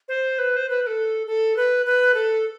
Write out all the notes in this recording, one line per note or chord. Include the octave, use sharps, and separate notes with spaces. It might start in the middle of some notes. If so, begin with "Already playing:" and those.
C5
B4
C5
B4
B4
A4
A4
B4
B4
A4